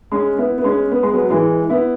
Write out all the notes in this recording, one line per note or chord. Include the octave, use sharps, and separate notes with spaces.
G#3 C#4
B3 E4
B3
G#3 C#4
B3
G#3
F#3 B3
E3 G#3
B3 E4